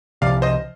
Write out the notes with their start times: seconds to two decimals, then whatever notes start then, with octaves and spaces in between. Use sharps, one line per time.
0.22 C2 C3 F3 D5 F5
0.42 C5 D#5